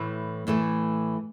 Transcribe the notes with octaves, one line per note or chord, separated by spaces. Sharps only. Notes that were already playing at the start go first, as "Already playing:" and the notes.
Already playing: A2 E3 A3
A2 E3 A3